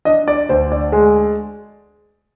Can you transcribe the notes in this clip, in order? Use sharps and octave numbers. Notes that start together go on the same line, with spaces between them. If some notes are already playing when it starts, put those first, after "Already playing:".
D4 D#5
D5
D2 C5
D5
G#3